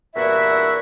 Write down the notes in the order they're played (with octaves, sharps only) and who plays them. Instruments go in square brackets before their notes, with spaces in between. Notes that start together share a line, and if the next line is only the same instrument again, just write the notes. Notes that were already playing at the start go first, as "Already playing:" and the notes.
[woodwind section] E2 G2 A#2 E4 F#4 E5